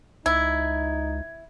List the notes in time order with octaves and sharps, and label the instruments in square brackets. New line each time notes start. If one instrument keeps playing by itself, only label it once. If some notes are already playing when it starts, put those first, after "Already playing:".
[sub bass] C#2 [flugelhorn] D#4 [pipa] E4 [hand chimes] G#6